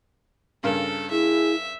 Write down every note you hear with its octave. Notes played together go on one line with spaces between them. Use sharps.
G2 C#3 A4 A#4
E4 G#4 E5